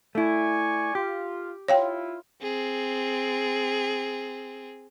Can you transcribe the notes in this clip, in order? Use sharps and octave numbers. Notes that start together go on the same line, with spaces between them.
A3 E4 D5 G#5 C#6
F4 G4
E4 F4 C#5 F5 G5
C4 G#4